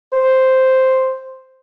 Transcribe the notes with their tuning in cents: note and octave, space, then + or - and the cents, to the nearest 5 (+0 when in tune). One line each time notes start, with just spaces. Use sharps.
C5 +0